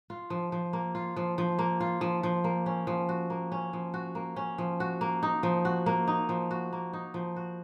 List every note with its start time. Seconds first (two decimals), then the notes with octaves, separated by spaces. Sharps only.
0.10 F4
0.30 F3
0.52 F3
0.73 A#3
0.95 F4
1.16 F3
1.38 F3
1.59 A#3
1.80 F4
2.01 F3
2.23 F3
2.44 A#3
2.66 C#4
2.87 F3
3.09 F#4
3.30 A#3
3.52 C#4
3.73 F3
3.94 F#4
4.15 A#3
4.36 C#4
4.58 F3
4.80 F#4
5.01 A#3
5.23 D#4
5.43 F3
5.65 F#4
5.86 A#3
6.07 D#4
6.29 F3
6.51 F#4
6.73 A#3
6.93 D#4
7.14 F3
7.36 F#4